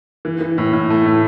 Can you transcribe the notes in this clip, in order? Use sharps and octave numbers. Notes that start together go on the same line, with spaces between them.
E3
E3
A2
A2
A3
A2